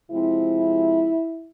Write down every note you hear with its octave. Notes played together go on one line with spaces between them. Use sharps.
C3 F3 G#3 C4 E4